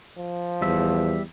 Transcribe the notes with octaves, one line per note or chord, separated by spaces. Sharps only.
F3
E2 G3 E5